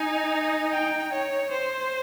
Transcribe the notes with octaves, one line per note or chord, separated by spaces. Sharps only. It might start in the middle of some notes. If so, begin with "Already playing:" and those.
Already playing: D#4 G#5
G5
C#5
C5